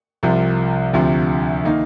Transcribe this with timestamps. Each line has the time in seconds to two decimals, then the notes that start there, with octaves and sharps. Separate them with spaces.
0.23 C2 C3 F3
0.93 D2 C3 F3
1.64 D#3 A#3 D#4